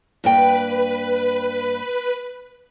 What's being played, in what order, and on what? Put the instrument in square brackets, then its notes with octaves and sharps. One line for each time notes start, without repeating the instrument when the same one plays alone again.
[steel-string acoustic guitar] G2 A#3 G5 [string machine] B4